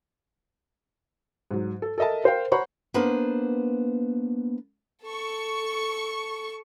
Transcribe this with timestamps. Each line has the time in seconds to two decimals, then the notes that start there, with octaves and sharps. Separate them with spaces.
1.51 G#2 F#3
1.82 A4
1.98 A4 A#4 D#5 E5 A5
2.24 A#4 C5 F5 G5
2.52 C5 C#5 F#5 A#5 B5 C#6
2.94 A#3 B3 D4 B4 C5
5.04 A4 C#6